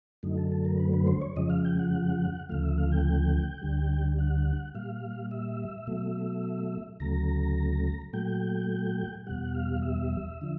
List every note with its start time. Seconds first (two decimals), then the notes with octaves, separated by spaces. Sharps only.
0.23 F#2 D3 F#3 A3 D#4
0.38 A4
0.52 A4
0.65 A#4
0.79 B4
0.94 B4
1.07 C5
1.22 C#5
1.36 F2 C#3 F3 G#3 D#5
1.50 F5
1.65 G5
1.79 F#5
2.49 D2 C#3 F3 A3 F5
2.63 E5
2.78 F5
2.91 G5
3.62 D2 D3 G3
4.19 F#5
4.75 A#2 G3 F5
5.31 E5
5.87 B2 F#3 A3
7.00 D2 C#3 F#3 A3 A#5
8.13 A#2 F#3 A3 G5
9.27 E2 B2 G3 F#5
9.54 F5
9.82 E5
10.41 D3 F3